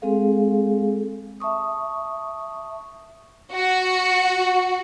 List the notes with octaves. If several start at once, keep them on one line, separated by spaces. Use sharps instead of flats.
G#3 C4 G#4 A4 F5
E5 A5 C#6 D#6
F#4